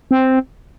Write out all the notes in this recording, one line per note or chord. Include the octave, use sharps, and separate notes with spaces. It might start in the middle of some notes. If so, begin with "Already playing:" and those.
C4